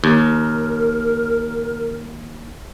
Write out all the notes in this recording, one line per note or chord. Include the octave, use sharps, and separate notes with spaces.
D#2 A#4